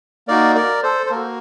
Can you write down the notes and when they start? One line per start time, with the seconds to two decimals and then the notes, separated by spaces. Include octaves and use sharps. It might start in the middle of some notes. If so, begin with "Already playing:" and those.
0.28 A#3 D#4 F#4 A#4 D5
0.55 A#4 D5
0.83 A4 C5
1.06 C5
1.11 A#3 F#4 A#4